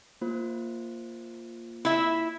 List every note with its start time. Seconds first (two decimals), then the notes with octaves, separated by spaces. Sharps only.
0.21 A#3 F4 C5
1.85 E4 E5